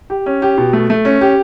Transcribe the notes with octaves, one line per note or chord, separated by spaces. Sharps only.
G4
C#4
G4
B2
A3
A3
C#4
G4